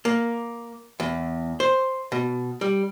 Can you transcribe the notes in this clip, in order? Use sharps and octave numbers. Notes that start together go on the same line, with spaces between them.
A#3
E2
C5
B2
G3